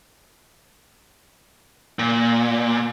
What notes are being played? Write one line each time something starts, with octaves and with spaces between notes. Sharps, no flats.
A#2